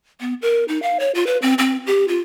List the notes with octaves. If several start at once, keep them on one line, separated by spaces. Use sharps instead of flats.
B3
A#4
D#4
F5
C#5
F4
B4
C4
C4
G4
F4